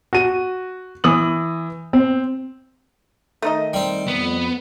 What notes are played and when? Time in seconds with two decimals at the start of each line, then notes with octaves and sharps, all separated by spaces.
0.13 F#4 D#7
1.04 E3 D#6 F#7
1.93 C4
3.42 D#3 A3 D#4 D#5
3.73 G3 C4
4.07 F2 B3